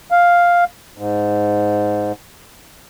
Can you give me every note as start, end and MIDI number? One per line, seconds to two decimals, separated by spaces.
0.11 0.64 77
0.98 2.12 44